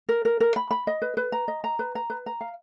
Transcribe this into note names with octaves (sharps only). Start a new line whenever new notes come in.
A#4
A#4
A#4
B5
B5
D#5
B4
B4
A#5
D#5
A#5
B4
A#5
B4
A#5
F5